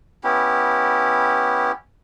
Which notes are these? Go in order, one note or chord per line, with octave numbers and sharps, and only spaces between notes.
B3 C#4 E4 G4